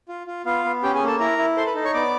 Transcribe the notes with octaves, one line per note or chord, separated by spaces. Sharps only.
F4
F4
B3 F4 F5
B3
C#4 G4 G5
G#4 G#5
A#3
A4 A5
E4 A#4 A#5
E4
A4 C5 C6
B4 B5
D#4
C#5 C#6
B3 D5 D6